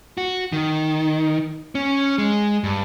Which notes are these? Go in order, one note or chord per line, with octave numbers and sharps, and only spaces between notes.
F#4
D#3
C#4
G#3
G2